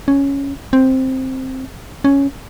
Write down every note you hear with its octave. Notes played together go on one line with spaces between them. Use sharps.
C#4
C4
C#4